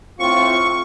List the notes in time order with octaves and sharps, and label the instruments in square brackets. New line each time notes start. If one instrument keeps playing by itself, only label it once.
[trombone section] A2 C4 F4 [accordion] C#6